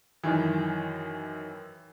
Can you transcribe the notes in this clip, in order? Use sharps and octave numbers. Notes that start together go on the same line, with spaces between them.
F#2 D#3 E3